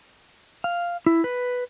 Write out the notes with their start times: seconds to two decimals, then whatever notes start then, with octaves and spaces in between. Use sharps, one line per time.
0.64 F5
1.06 E4
1.24 B4